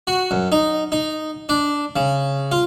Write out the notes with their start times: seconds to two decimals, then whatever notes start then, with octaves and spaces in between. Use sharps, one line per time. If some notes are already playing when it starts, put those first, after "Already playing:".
0.07 F#4
0.31 F#2
0.52 D#4
0.92 D#4
1.49 D4
1.96 C#3
2.52 F4